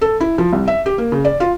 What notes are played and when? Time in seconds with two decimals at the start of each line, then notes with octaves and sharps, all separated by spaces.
0.01 A4
0.20 E4
0.38 F3
0.53 C2
0.68 E5
0.86 G4
0.98 A#3
1.12 C#3
1.25 D5
1.40 F4